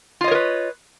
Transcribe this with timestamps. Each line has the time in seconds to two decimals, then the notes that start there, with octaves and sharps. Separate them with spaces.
0.21 F4
0.24 D#5
0.28 C#5
0.31 A#4
0.35 B4